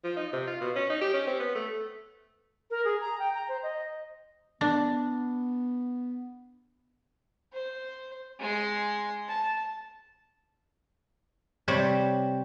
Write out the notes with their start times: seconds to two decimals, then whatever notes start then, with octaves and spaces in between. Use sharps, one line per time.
0.04 F3
0.17 D#4
0.33 C3
0.47 F4
0.61 B2
0.76 C#4
0.90 D#4
1.01 G4
1.14 C#4
1.27 C4
1.40 B3
1.55 A3
2.71 A#4
2.85 G#4
3.01 A#5
3.19 G5
3.34 A#5
3.49 C5
3.63 D#5
4.61 B3 D4
7.53 C5
8.40 G#3 C6
9.28 A5
11.68 C3 G3 C4 C5 C#5 B5